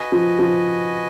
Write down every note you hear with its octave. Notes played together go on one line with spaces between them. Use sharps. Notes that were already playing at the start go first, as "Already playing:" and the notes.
Already playing: F#4 B4 D#5 G#5
F3
F3